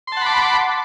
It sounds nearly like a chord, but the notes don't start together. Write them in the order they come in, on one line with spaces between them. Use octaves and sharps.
C6 A5 F#5 B5 D6